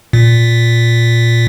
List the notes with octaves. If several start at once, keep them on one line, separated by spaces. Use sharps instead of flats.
A#2